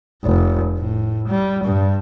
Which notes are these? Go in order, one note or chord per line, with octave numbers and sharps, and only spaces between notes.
F1
A2
G3
G2